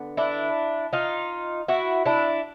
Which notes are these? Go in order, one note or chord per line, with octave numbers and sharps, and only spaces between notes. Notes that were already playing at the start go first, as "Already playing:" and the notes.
Already playing: D3 B3
D4 E4
D#4 F4
E4 F#4
D4 E4